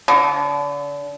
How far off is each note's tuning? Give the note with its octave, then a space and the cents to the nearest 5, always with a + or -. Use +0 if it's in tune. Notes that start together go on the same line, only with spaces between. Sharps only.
D3 -35